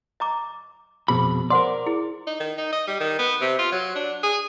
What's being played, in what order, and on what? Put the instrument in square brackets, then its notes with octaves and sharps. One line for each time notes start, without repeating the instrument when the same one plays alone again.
[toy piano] D#5 A#5 D6
[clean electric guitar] F2 B2 B5 [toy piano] F#4 G#4 C5
[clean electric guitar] A#4 D5 [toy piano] C5 F#5 C6
[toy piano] E4 G#4
[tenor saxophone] D#4
D#3
D#4
D#5
G3
D#3
B3
C3
F4
F#3
D4
G#4